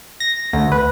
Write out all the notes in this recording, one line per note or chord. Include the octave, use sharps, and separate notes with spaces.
A#6
D2
B4